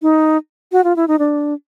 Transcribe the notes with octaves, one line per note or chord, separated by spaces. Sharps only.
D#4
F#4
F4
E4
D#4
D4